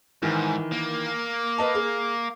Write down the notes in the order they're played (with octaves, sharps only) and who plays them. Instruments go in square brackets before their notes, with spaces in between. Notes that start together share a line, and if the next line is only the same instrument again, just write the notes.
[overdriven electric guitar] G#2 [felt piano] D#3 E3
[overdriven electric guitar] A#3
[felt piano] B4 D#5 A5
G#4